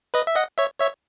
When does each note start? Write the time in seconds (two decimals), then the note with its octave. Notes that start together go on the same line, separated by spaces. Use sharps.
0.14 B4 D#5
0.27 E5
0.36 D#5 F#5
0.58 C#5 E5
0.80 C#5 E5